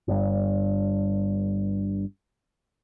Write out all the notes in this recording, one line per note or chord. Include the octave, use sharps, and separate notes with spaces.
G1 G2